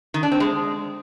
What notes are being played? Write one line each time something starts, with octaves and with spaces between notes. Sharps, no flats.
D#3
D4
C4
G#3